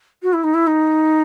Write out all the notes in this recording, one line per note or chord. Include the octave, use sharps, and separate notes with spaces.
F#4
E4
D#4
E4
D#4